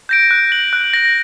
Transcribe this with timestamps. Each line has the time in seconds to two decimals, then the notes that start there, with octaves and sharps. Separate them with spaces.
0.09 G6 A#6 D7
0.31 F#6
0.52 A#6 F#7
0.73 F#6
0.94 A#6 F#7